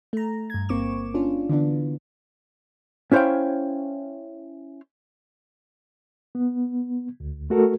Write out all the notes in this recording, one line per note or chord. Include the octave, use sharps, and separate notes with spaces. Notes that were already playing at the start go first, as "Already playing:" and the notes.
A3 A#5
G2 G#6
G1 A#3 C4 C#6 D6 E7
C#4 D4 F4
D3 E3 B3 D4
C#4 E4 C5 C#5 F5 G5
B3
D2
A3 F#4 A4 A#4